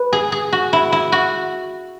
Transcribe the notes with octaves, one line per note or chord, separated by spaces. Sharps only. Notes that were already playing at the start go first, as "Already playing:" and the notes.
Already playing: B4
G#4
G#4
F#4
E4
E4
F#4